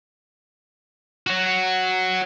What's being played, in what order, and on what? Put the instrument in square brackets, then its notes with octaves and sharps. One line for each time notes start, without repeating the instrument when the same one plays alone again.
[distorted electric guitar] F#4 C#5